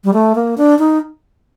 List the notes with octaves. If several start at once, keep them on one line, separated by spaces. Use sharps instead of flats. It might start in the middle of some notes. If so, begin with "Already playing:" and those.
G3
A3
A#3
D4
D#4